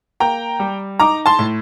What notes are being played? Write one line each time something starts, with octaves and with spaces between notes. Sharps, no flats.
A#3 G5 A#5
G3
D#4 A#5 D6
A5 C6
A2